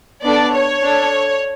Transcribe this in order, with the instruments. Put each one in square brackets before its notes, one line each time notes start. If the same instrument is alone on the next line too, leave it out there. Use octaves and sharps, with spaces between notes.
[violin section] B3 D4 A4 D5
C#5
D4 A4